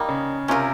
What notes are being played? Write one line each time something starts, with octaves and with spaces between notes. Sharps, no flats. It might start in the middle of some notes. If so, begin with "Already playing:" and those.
Already playing: G3 A#3 D#4
C#3
C3 C#4 F4 A#4